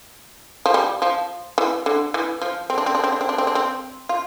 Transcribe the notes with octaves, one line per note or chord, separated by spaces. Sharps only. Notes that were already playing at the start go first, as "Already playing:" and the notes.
F3
G3
F3
E3
D3
E3
F3
C4
D4
C4
D4
C4
D4
C4
D4
C4
D4
C4
F4